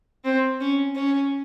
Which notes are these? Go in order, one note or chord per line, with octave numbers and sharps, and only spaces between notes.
C4
C#4
C#4